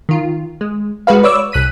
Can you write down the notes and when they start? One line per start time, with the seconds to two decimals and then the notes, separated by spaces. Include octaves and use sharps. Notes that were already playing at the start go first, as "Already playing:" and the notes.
0.09 D#3 F4
0.61 G#3
1.07 G#3 F#4 B4 F5
1.23 B4 C#5 D5 D6 E6
1.52 C2 F#6 B6 D#7